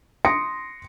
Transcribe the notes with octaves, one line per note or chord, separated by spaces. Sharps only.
C6 D#6 A#6 C#7 D7